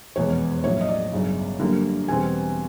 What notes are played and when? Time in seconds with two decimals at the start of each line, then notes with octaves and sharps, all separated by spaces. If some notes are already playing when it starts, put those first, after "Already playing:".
0.16 F1 E2 B2 G#3 B3 C#5
0.64 A#1 A2 F#3 C#5
0.81 D#5
0.89 D5
1.12 G1 F#2 C#3
1.60 F#2 D3 G3 A#3
2.08 E2 B2 G3 C4 G#5